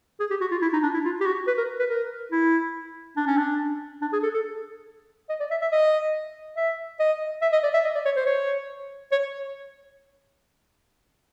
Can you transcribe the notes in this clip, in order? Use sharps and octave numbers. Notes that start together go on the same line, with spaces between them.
G#4
G4
F#4
F4
E4
D#4
D4
E4
F4
G4
F#4
B4
A#4
B4
A#4
E4
D4
C#4
D4
D4
G#4
A4
A4
D#5
D5
E5
E5
D#5
E5
D#5
E5
D#5
D5
E5
D#5
D5
C#5
C5
C#5
C#5